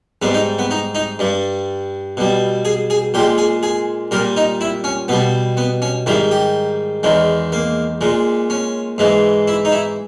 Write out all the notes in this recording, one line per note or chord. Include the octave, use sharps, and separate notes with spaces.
G#2 G3 B3
D#4
B3
D#4
D#4
G2 G3
B2 G3
G#4
G#4
A#2 G#3 G4
G#4
G#4
A#2 G3 A#4
D#4
E4
C#4
B2 G3 B3
B3
C#4
G#2 D#3 G3 E4
G4
E2 D#3 G#3
A#3
A#2 G#3
C#4
G#2 E3 G#3
E4
D#4
E4